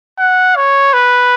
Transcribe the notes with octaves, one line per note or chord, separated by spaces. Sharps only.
F#5
C#5
B4